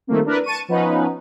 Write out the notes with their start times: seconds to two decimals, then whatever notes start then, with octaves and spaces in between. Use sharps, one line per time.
0.07 D#3 F3 G3 A3 A#3 C4
0.26 D4 E4 A#4 B4
0.44 A5 C#6 D#7
0.68 F3 B3 C#4 D#4 B4